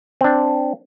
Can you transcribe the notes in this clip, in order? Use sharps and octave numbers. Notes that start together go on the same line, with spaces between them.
C4 D4